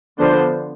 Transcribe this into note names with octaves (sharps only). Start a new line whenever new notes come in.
D3 F3 B3 D4 C5